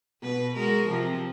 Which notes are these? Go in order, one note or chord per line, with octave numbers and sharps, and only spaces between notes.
B2 B4
G#3 F#4 A#4
C3 F3